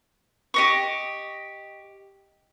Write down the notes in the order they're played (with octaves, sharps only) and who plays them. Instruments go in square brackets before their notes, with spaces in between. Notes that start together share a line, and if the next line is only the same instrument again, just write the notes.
[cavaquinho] G4 D#5 C#6